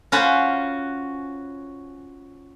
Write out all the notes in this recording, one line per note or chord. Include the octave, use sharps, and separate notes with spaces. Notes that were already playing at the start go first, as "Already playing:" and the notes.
C#4 F4 F#4 C5 B5